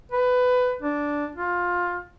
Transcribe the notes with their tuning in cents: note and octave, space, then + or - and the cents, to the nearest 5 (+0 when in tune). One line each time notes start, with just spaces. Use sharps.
B4 +20
D4 -5
F4 +15